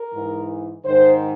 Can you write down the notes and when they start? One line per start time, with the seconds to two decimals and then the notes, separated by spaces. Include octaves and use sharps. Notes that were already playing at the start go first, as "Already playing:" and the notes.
Already playing: A#4
0.13 G#2 E3
0.85 G#2 D#3 C5